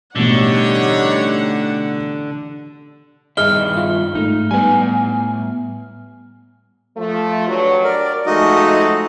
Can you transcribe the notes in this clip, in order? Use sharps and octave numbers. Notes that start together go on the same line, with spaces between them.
A1 B2 D3 G3 D#4 G4 C#5 F#5
G2 D#3 E4 G#4 D#5 F6 G7
F4
G#2 A3 D#4
A2 G3 B3 G#5
F3 A3
G2 F#3
A#4 D5
F3 G#3 A3 D#4 F#4 D#5